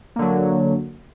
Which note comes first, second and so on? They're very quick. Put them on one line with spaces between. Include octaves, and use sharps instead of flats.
A#3 D3 F#3